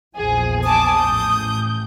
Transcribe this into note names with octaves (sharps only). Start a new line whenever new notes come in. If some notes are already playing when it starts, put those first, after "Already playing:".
A#1 E2 F3 G#4
G#5 A5 D6 D#6
A1 A2 G6